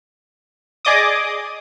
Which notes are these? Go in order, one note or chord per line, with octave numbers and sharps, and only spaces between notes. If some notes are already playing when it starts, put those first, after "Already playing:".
G#4 D5 D#5 D6 D#6